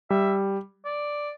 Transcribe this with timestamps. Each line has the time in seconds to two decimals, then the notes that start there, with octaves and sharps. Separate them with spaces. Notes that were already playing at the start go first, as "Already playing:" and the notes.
0.10 G3 E5
0.85 D5